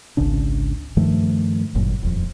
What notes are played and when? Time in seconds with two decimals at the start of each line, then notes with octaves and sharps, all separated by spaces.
0.17 G#1 C#2 C#3 D4
0.97 G2 D#3 F3 A3
1.75 G1 F#2 A#2
2.03 D#1 F2